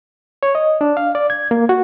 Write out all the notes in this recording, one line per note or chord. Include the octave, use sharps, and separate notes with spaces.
C#5
D#5
D4
F5
D5
G#6
A#3
F#4